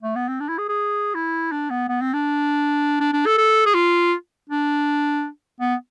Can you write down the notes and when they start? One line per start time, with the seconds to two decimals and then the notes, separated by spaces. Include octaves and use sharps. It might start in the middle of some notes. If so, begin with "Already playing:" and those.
0.03 A3
0.16 B3
0.29 C4
0.40 D4
0.49 E4
0.58 G#4
0.69 G#4
1.15 E4
1.52 D4
1.70 B3
1.89 B3
2.02 C4
2.14 D4
3.00 D4
3.14 D4
3.26 A4
3.38 A4
3.66 G#4
3.75 F4
4.50 D4
5.61 B3